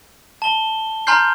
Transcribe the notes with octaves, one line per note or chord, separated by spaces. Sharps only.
A5 G7
G#5 A#5 C6 F6 G6 C7